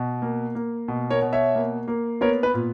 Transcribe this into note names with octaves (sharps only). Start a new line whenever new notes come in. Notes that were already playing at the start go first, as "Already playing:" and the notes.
Already playing: B2
A#3
A#3
B2
A#4 C#5
B2
C#5 E5
A#3
A#3
B3 A#4 C#5
B4
A#2